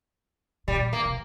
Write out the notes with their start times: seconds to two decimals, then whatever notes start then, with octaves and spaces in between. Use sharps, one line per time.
0.68 A#2 G3
0.93 A#3
1.05 C3